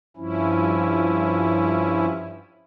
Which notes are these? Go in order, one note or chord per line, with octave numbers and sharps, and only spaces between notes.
G2 F3 C#4 E4